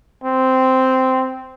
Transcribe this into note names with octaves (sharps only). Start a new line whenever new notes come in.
C4